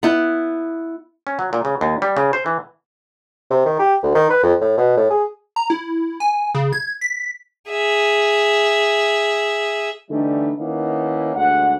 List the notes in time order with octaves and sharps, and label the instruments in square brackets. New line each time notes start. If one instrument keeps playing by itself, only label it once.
[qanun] B3 E4
[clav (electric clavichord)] C#4
F#3
A#2
C#3
D#2
G3
C#3
C5
E3
[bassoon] C3
D#3
G4
D2
D#3
B4
F2
A2
B2
A2
G#4
[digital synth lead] A#5
E4
G#5
C#3
G#6
B6
[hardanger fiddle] G#4 E5
[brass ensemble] D3 E3 G3 A3 D#4
D#3 A#3 B3 C#4 D#4 E4
D2 G#2 G3 F#5